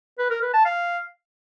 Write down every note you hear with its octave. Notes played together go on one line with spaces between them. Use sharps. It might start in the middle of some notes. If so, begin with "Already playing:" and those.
B4
A#4
B4
A5
F5